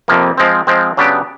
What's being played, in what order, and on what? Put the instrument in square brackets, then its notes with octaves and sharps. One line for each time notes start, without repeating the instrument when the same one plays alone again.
[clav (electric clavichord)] F2 C3 F3 A#3
F3 G#3 C4
F3 G#3 C4
C#3 F#3 B3 D4 G4